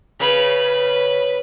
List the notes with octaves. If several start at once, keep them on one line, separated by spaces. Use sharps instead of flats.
C#3 B4